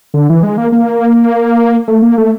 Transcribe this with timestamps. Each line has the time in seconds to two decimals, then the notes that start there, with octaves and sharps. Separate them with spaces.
0.14 D3
0.30 E3
0.43 G#3
0.58 A#3
0.72 A#3
1.88 A3
2.02 A#3
2.18 A3